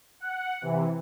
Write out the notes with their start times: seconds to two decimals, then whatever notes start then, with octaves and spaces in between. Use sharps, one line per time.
0.20 F#5
0.62 C3 E3